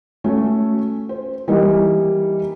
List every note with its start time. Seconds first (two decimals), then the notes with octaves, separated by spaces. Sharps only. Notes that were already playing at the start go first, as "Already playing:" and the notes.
0.24 A3 C#4 F#4
1.09 C5
1.48 E3 G3 A#3 D#4 D#5